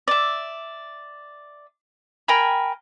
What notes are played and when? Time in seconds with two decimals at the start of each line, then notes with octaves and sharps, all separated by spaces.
0.08 D5 E5
2.28 A#4 G5 G#5 B5